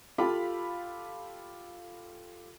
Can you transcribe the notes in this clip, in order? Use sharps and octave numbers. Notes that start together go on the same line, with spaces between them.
F4 G4 A4 F5 B5